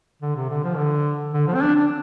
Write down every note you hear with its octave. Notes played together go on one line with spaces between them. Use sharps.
D3
C3
D3
F3
D3
D3
F3
C4
D4
D4